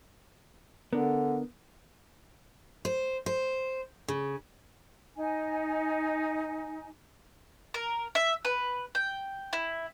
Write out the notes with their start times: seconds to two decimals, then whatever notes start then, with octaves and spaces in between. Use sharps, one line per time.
0.93 D3 B3 D4 A#4
2.85 C5
3.26 C5
4.08 C#3
5.16 D#4 G#5
7.74 A#4
8.15 E5
8.45 B4
8.95 G5
9.53 E4